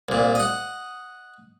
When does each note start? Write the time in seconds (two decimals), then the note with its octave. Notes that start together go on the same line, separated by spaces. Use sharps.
0.09 C2 A#2
0.35 D#5 F#5